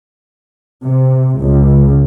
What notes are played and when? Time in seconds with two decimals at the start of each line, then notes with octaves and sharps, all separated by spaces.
0.85 C3
1.40 C#2